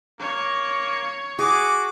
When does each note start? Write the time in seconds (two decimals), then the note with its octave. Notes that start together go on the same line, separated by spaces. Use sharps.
0.20 A#3 C#5
1.39 F#4 G#4 D6